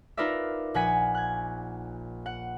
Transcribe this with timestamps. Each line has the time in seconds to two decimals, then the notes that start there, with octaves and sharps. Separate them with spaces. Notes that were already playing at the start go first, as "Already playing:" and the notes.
0.17 D#4 F4 A#4 B4 D5 E5
0.74 A#1 F#5 G#5 B6 D#7
1.15 F#6 G#6
2.26 F#5